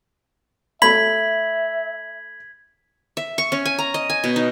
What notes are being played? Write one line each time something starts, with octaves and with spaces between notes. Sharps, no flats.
A3 E5 B5 G#6 B6 F#7
E5
C#6
C#4
G#5
A#5
D#5
G#5
B2
D#4